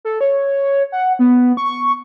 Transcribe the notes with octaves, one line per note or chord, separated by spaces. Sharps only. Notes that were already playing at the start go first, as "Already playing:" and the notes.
A4
C#5
F#5
B3
C#6